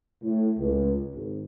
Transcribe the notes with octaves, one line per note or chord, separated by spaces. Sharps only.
A2
C#2
G#1